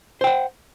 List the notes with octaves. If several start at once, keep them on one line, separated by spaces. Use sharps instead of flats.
C5 F#5 G5